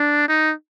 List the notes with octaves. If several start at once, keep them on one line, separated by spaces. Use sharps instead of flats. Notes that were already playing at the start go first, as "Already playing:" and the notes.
Already playing: D4
D#4